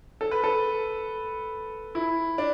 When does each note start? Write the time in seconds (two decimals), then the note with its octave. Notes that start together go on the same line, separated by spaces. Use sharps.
0.21 A4
0.31 B4
0.44 A4
1.95 E4
2.38 D4